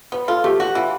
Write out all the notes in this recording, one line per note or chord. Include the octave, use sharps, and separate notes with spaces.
B3 B4
F4 A4
A3 G4
F#4 G4
E3 F4